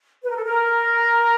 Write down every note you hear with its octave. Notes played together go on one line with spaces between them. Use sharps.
B4
A#4
A4
A#4